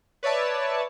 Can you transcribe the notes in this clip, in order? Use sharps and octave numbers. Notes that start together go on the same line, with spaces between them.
B4 C#5 D5 E5 A5